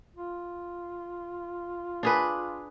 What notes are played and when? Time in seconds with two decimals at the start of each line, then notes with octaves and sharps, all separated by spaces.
0.16 F4
2.03 D4 G#4 B4